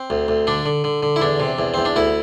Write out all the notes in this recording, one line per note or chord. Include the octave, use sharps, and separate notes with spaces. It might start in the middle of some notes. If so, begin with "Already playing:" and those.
Already playing: C4
D2
D2
D3 D4
D3
D3
D3
E4
E2 D4
C3
E2
E2 C4
D4
D2 E4